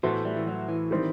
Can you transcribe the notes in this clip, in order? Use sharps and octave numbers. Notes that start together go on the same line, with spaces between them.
A2 E3 A3 B3 F#4 C5
G3
E3
F#3
E3
D#3 G3 C4